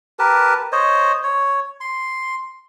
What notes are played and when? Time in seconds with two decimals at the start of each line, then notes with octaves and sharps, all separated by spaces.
0.19 G4 A#4 B4 A5
0.72 C5 C#5 D#5
1.23 C#5
1.80 C6